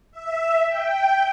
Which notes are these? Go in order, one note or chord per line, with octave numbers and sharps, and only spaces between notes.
E5
G5